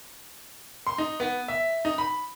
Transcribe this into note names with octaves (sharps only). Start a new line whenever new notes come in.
C6
D#4
B3
E5
D#4
B5